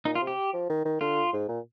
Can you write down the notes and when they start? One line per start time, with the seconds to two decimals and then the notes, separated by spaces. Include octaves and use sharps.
0.05 A#2 D#4
0.15 F4
0.21 C3
0.27 G4
0.54 F3
0.70 D#3
0.85 D#3
1.01 D3 F4
1.33 G#2
1.49 A#2